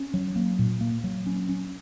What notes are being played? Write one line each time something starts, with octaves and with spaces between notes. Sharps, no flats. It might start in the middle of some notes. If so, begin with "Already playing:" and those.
Already playing: C#4
F#3
A#3
A#2
A#3
F#3
C#4
C#4